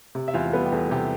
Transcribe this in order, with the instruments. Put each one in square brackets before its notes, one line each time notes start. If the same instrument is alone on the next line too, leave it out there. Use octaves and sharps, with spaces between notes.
[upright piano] C3
E5
E2 F4 F5
G3 B3 B4
G4
E2 A4
C3 G4